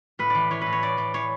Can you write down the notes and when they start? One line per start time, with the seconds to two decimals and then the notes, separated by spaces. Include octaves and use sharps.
0.19 A2 B4
0.30 E3 D5
0.51 E3 C#5
0.61 A2 B4
0.72 C#5
0.82 A2 D5
0.97 E3 D5
1.14 E3 C#5